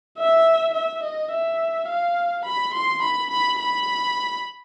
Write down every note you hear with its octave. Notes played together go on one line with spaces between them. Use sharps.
E5
E5
D#5
E5
F5
B5
C6
B5
B5
B5